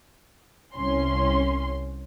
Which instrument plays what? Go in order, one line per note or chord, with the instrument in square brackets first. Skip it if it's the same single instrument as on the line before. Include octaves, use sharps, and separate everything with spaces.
[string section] C2 C#4 C6